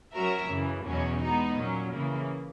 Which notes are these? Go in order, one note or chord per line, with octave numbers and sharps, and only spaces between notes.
F#3 C#4 F#4 A#4 E5
F#2 C#3 E3
E2 B2 F#3 C#4
G#3 B3 D#4
A#2 F#3 C#4
C#3 E3 A#3